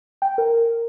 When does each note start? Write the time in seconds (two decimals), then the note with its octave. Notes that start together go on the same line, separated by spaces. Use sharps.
0.22 G5
0.38 A#4